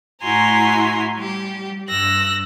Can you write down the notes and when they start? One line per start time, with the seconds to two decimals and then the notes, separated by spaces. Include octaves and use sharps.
0.22 A2 E4 F#4 G#5 A#5 C6
1.16 G3 G4
1.89 G2 E6 F#6 A#6